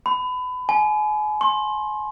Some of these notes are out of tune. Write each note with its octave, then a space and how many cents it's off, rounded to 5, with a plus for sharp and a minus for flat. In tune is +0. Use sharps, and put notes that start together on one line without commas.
B5 +25
G#5 +35
C6 +30